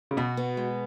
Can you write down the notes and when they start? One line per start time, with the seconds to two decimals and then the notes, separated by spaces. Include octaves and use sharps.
0.11 C#3
0.17 B2 F#4
0.37 B3
0.57 G#3